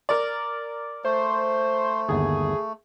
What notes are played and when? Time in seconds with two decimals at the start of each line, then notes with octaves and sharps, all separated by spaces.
0.09 A#4 D5
1.05 A3 C5
2.09 G1 D#2 G#4